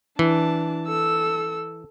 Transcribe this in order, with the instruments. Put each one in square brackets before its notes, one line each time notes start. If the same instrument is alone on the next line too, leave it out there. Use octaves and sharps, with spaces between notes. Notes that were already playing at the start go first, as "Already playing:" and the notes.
[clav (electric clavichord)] E3 [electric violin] D4 A5
[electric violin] A4 E6